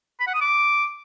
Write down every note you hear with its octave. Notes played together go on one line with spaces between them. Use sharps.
B5
F#5
D#6
D6